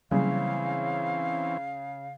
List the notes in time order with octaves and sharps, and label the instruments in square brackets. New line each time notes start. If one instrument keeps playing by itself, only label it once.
[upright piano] C#3 [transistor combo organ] E3 C4 C#4 [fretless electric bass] F#3 G3 A#3 [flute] F5